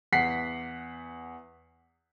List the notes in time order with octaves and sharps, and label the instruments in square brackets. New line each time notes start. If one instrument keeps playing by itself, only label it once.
[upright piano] E2 F#5 B6 C7